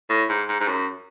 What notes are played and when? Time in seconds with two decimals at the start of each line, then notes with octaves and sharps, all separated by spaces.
0.10 A2
0.29 G#2
0.49 G#2
0.60 G#2
0.68 F#2